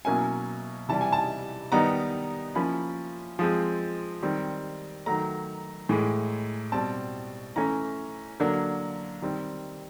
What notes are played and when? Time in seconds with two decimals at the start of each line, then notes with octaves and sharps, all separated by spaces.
0.05 B2 F#3 A#3 C#4 E4 G#5
0.89 C3 E3 G3 A5
1.01 G#5
1.12 A5
1.72 D#3 G3 B3 D#4 A#5
2.55 F3 A#3 C#4 E4 B5
3.39 F3 G#3 C4
4.22 D#3 G3 C4
5.06 D#3 F#3 A3 A#5
5.89 A2 E3 G#3
6.72 B2 G3 C4 A5
7.56 E3 A3 C#4 A#5
8.40 D3 F#3 A#3 D4
9.22 D#3 G3 C4